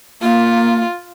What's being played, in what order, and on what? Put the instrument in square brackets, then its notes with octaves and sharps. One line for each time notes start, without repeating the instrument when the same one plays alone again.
[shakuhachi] A#3 [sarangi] F4